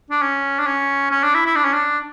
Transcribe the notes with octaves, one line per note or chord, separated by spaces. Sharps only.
D4
C#4
D4
C#4
C#4
D4
E4
E4
D4
C#4
D4